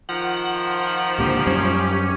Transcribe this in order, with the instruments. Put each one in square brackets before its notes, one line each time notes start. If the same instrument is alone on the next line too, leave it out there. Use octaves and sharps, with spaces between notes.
[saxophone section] D#3 F3 [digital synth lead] F#5
[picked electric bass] C#2 A#2 D3 [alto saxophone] G4
[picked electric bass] F#2 G3 [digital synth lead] C#4